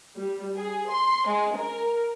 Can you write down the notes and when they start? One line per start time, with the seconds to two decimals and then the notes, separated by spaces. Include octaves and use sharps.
0.18 G3
0.57 G#4
0.90 C6
1.27 G#3
1.56 A#4